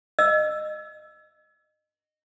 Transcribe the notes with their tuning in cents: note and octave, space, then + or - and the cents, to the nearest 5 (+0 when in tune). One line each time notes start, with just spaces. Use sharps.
D#5 -25 E6 +10